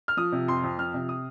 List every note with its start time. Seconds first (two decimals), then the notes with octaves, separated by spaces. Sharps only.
0.08 F6
0.17 F3 D#6
0.32 C3
0.48 F2 C6
0.63 F2
0.78 F3 F6
0.94 C3
1.09 D#6